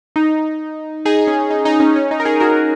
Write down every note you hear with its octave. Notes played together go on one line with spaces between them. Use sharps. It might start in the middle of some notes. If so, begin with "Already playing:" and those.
D#4
D#4 G#4
C#4
D#4
D#4
C#4
C#4
D#4
A#4
D#4 G#4
F#4 A#4